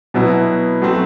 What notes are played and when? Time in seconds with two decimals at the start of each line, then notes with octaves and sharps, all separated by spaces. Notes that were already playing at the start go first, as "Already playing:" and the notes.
0.14 B2 F#3 B3 E4
0.82 F#3 A3 C4